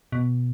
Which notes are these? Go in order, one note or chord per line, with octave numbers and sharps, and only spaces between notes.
B2